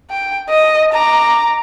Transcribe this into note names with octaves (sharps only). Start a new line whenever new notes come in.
G5
D#5
A#5 D6